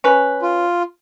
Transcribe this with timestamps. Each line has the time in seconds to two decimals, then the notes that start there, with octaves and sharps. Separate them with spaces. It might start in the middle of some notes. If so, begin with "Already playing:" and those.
0.04 C#4 B4
0.42 F4